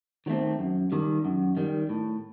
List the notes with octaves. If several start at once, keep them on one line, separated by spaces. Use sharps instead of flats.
D#3 F#3 A3 C4
F#2
D#3 G3
F#2
D#3 G3
A2